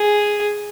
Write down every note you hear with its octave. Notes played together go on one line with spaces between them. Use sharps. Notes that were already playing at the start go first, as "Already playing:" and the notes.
Already playing: G#4